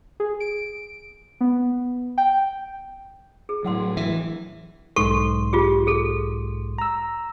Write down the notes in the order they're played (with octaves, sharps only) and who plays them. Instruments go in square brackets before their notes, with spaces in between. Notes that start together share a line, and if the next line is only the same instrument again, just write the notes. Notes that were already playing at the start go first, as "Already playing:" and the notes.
[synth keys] G#4
D7
B3
G5
[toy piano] G#4
[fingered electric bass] A2 F#3 [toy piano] E4 F#5 C6
[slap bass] E3 [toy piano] E5
[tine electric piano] B1 G#2 C6 [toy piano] A4 C#6
[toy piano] F4 G4 G#4
G#4 A4
[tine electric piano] A#5 E6